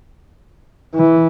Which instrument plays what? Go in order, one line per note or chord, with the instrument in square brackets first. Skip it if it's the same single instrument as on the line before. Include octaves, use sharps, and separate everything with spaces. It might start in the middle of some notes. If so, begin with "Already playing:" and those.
[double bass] E3